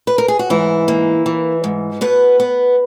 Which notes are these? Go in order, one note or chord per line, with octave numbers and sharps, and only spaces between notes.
B4
A#4
G#4
F#4
G#2 E3 E4
A#3
E3
G#2
B2 B3 B4
B3